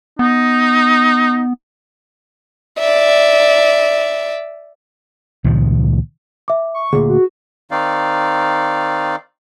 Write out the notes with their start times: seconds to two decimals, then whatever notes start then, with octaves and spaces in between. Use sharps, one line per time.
0.19 B3 D#4
2.78 D5 E5
5.44 C#2 A#2 D#3 F3
6.48 E5 D6
6.74 C#6
6.93 D2 A#2 G#4
7.09 F#4
7.71 D#3 C4 D#4 D5 F5